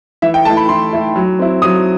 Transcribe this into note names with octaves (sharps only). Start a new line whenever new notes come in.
E3 E5
G5
A3 E4 A5
B5
E3 C6
A3 E4
F#3
C4 E4
F#3 D#6